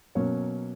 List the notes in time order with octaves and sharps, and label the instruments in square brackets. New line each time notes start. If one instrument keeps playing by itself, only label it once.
[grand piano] B2 F#3 A#3 C#4 C#5